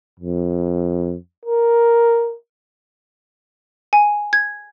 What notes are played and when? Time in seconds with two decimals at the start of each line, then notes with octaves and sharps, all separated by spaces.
0.20 F2
1.45 A#4
3.93 G#5
4.33 G#6